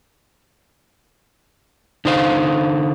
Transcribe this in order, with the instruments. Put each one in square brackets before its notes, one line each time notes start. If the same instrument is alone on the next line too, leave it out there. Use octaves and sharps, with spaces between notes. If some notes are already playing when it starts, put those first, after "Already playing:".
[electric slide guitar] D3 D#4 C5 F5